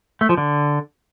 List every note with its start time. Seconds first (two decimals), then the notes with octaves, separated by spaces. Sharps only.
0.21 A3
0.29 F3
0.37 D3